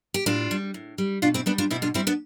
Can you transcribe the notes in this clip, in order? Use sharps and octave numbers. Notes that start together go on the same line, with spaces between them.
G4
A2 D4 F4
G3
A2
G3
B2 D4 F4
C4 E4
G3 B3 D4
D4 F4
B2 C4 E4
D4 F4
G3 C4 E4
B3 D4